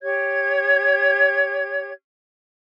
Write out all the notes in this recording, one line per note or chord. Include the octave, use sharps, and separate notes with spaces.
G4 C#5 G#6